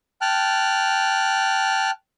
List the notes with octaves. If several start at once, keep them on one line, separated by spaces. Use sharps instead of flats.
G5 A5 F6 F#6